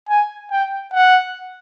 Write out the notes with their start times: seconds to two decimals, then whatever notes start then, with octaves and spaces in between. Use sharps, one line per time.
0.09 G#5
0.51 G5
0.93 F#5